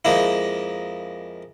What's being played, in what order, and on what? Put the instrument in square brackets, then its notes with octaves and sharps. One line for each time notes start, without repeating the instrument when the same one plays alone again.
[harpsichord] F2 G#3 A#3 E4